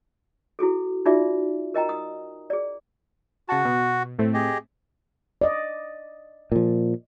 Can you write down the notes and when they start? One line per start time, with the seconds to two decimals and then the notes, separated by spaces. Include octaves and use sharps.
0.59 E4 F#4 G#4 A4
1.06 D#4 F4 F#4 G#4 D5 E5
1.74 A#4 D#5 G5 A#5
1.89 D#6
2.50 G#4 D5
3.49 C#3 F#4 F#5 A5
3.65 B2
4.19 A2 A3 C4
4.34 G4 G#4 D#5
5.41 D5 D#5
6.52 A#2 F3